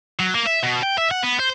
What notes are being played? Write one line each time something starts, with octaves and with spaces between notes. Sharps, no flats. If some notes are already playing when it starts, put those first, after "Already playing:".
F#3
A#3
E5
B2
G5
E5
F#5
B3
C5